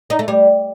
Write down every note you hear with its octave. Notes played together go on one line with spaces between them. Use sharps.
D#4
A3
G3